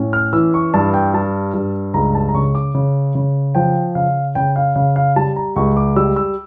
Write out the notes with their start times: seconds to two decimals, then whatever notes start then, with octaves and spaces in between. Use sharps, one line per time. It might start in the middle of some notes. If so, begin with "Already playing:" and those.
Already playing: A2 C#4
0.13 F6
0.33 E3 E6
0.54 C#6
0.74 G2 A5
0.94 G5
1.14 G3 A5
1.54 G2
1.94 C#2 A#5
2.15 A5
2.29 A#5
2.35 C#3 C#6
2.55 D6
2.75 C#3
3.15 C#3
3.55 F3 G5
3.95 C#3 F5
4.35 C#3 G5
4.56 F5
4.76 C#3 F5
4.96 F5
5.16 G3 A5
5.36 A#5
5.56 C#2 C#6
5.77 D6
5.96 G3 E6
6.16 E6